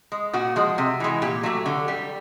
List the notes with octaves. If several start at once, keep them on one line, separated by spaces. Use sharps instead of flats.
G#3
A#2 F#4
F3 G#3
C3
E3 G#3
A#2 G4
F#3 A3
D3
G3